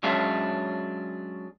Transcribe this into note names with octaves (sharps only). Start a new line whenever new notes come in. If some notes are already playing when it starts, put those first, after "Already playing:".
F#3 G#3 C#4 D4 G#4 E5